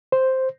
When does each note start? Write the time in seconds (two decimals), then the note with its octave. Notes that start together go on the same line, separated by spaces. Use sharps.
0.12 C5